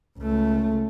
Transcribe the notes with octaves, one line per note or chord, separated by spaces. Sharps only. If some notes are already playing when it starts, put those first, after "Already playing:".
C#2 A3